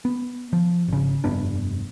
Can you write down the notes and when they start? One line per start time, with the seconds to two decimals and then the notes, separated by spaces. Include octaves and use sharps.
0.05 B3
0.53 F3
0.88 G#1 C#3
1.24 F1 G2 B3 D4